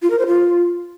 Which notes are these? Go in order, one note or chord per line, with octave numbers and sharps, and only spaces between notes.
F4
A#4
C5
F4